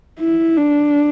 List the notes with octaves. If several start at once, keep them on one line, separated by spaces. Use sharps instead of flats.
E4
D4